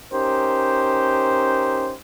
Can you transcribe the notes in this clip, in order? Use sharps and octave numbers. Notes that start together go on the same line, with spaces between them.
C#4 D#4 G4 A#4 C5